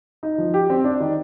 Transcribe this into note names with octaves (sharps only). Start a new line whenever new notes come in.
D#4
F3
G4
C4
D4
D#3